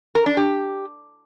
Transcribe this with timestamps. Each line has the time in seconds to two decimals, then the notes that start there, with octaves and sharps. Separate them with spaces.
0.15 A#4
0.26 D4
0.37 G4